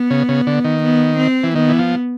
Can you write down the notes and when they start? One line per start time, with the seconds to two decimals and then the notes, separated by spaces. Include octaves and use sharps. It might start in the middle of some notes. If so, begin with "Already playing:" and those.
Already playing: B3
0.10 C#3
0.29 C#3
0.47 D3
0.64 D#3
0.83 B3
1.18 C4
1.44 E3
1.55 D#3 B3
1.69 E3
1.79 F3